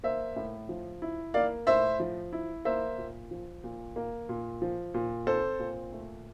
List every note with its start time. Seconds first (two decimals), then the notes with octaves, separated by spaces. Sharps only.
0.04 A#3 C5 E5
0.36 A2
0.69 F3
1.02 E4
1.34 A#3 D5 F5
1.67 A2 C5 E5
2.00 F3
2.33 E4
2.65 A#3 C5 E5
2.98 A#2
3.31 F3
3.64 A#2
3.96 A#3
4.29 A#2
4.62 F3
4.94 A#2
5.27 C4 A4 C5
5.59 A#2
5.92 A3